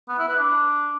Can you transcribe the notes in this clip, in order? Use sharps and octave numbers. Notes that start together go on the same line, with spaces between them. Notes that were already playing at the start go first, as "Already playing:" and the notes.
B3
E4
B4
D4